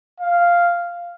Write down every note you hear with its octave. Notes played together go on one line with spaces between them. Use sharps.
F5